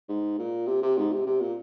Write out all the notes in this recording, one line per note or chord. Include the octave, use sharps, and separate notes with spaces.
G#2
A#2
C3
C3
G#2
C3
C3
A#2